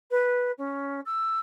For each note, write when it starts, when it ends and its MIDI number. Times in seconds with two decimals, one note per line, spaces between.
0.11 0.52 71
0.58 1.00 61
1.05 1.39 88